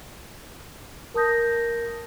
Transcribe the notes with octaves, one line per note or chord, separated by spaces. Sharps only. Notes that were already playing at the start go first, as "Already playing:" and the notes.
A#4 A5 D#6 G6 A#6